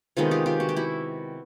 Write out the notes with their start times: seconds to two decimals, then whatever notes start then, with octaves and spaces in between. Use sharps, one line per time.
0.17 C3 D#3 G#3 B3 D#4 F4
0.31 F4 G4
0.46 F4 G4
0.60 F#4
0.69 G4
0.76 E4 F#4